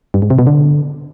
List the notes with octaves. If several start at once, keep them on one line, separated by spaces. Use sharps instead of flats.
G2
G#2
C3
B2
D3